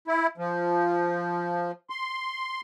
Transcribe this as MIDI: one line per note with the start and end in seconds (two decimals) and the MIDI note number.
0.08 0.27 64
0.38 1.72 53
1.90 2.61 84